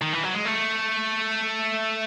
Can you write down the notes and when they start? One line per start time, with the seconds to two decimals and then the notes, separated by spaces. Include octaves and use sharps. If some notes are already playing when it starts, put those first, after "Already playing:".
0.02 D#3
0.13 E3
0.24 F#3
0.34 G#3
0.45 A3